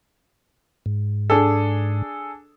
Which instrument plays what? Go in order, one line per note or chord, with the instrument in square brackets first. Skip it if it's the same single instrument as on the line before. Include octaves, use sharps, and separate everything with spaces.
[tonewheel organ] G#2
[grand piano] D4 G#4 A4